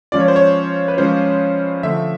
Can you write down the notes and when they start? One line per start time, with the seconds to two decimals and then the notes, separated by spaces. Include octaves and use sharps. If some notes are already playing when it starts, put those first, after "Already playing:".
0.12 F3 G#3 C#4 F4 D5
0.20 C#5
0.28 C5
0.36 C#5
0.88 B4
0.97 F3 G#3 C#4 F4 C5
1.83 D3 F3 A3 E5